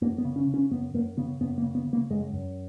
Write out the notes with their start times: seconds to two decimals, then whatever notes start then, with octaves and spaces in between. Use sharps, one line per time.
0.01 F#2 A#3
0.18 B3
0.25 C#3
0.36 C#4
0.47 C#3
0.54 C#4
0.71 F#2 B3
0.94 F#2 A#3
1.17 C#3 B3
1.40 F#2 B3
1.58 A#3
1.63 C#3
1.75 B3
1.87 C#3
1.93 A#3
2.10 F#2 G#3
2.33 F#2